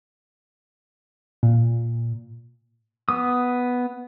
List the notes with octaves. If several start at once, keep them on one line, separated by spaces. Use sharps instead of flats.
A#2
B3 D#6